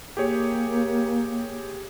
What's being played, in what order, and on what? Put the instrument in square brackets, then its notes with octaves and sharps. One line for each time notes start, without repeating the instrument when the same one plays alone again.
[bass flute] A#3 [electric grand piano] G4 G#4 C#5